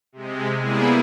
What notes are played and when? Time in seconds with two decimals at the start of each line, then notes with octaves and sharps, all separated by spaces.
0.12 C3 G#3
0.59 G3 A#3 B3 E4 G#4